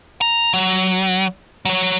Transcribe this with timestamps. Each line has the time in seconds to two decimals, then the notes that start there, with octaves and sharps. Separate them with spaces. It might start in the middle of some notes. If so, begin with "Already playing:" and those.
0.21 A#5
0.54 F#3
1.65 F#3 C#5